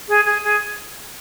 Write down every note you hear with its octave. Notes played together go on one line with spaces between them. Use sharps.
G#4
G#4
G#4